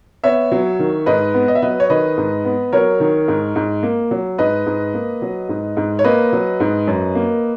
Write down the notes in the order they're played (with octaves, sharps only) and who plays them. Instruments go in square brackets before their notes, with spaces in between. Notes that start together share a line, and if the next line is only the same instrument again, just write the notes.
[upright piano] B3 C#5 E5
F#3
D#3
G#2 B4 D#5
B3
D#5
E5
F#3 B4 D#5
C#5
D#3 B4 D#5
G#2
B3
F#3 A#4 C#5
D#3
G#2
G#2
A#3
F#3
G#2 B4 D#5
G#2
A#3
F#3
G#2
G#2
C#5
A#3 B4 D#5
F#3
G#2
F#2
A#3